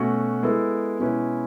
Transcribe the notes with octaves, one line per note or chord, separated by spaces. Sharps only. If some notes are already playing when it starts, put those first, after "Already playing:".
Already playing: B2 A3 C#4 F#4
G#3 B3 E4 A4
B2 G#3 C#4 E4 B4